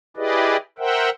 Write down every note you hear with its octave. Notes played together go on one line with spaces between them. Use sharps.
E4 G4 G#4 B4 D5 D#5
A#4 C5 E5 F#5 G5